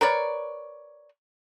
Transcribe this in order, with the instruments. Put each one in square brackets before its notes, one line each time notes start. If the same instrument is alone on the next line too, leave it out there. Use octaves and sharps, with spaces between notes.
[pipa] A#4 B4 C#5 D5